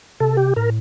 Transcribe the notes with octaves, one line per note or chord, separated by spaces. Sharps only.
C3 A4
G4
A2 A#4